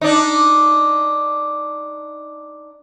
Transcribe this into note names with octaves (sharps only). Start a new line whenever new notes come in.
D4 D#4